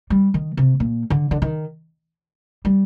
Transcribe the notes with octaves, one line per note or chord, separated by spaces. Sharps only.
G3
D#3
C3
A#2
D3
D3
D#3
G3